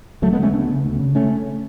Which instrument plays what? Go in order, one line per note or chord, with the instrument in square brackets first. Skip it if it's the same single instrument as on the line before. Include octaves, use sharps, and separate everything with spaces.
[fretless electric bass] D2 F#3 A3
G#3 B3
C#3
A3 C#4
D2 B3 D4
C#3
D2
C#3
A3 C#4